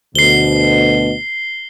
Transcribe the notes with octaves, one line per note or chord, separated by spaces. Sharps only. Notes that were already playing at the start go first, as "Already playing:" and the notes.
D2 B2 C7 G7